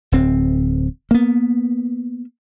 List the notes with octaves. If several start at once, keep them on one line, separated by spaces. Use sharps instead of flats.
D1 C4
A#3 B3